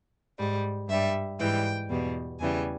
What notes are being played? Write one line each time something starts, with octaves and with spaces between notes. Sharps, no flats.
G#2 G3
G2 G3 E5
G#2 E3 G3 G5
E2 B2 G3
E2 C#3 E3 G3 G#5